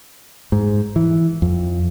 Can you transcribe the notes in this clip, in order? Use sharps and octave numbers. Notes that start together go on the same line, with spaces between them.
G#2
E3
F2